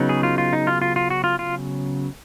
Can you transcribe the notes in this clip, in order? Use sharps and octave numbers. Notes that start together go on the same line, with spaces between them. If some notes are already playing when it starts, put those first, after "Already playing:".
Already playing: C#3 F#3 B3 D#4
G#4
F4
F4
D#4
F4
F4
F4
F#4
F4
F4